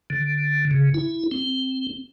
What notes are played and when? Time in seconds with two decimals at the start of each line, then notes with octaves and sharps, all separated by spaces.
0.10 D3
0.71 C#3
0.94 E4
1.31 C4